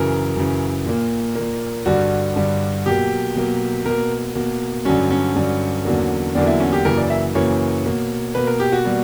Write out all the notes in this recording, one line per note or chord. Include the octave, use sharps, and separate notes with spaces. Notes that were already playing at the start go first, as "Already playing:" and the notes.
Already playing: F#2 C#3 E3 A#4
F#2 C#3 E3
A#2 A#3
A#2 A#3
G2 D3 G3 F#4
G2 D3 G3
B2 F#3 A#3 G4
B2 F#3 A#3
B2 A#3 A#4
B2 A#3
G2 D3 F#3 C#4
C#4
G2 D3 F#3
E2 D3 F#3 A#3
E2 D3 F#3 A#3 D4
E4
C#4
G4
F#2 C#3 E3 A#3 A#4
D5
E5
F#2 C#3 E3 A#3 C#5
B2 A#3
B2 A#3 B4
A#4
G4
F#4
B2 G3 A#3